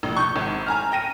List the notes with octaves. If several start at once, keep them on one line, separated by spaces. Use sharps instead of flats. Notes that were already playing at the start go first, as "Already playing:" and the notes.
A#1
C#6 G6
G#1
G#5 A#5 F6
G5 A#6 D#7